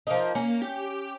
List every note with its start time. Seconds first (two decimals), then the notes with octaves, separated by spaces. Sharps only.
0.07 F3 A#3 D#4
0.35 A#3 C#4
0.62 G4